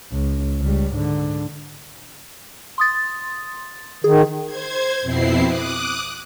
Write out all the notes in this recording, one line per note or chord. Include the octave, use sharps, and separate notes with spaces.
C#2
C#2 G3
G#2 D3
C6 D#6 A6
D#3 G#4
C5 G#6
F2 B2 C4 E4 C7
D6 D#6 F#6